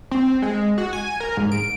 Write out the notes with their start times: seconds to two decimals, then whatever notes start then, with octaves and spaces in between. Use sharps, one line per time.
0.11 C4
0.42 G#3
0.78 F#4
0.93 G#5
1.20 A#4
1.37 G#2
1.52 D7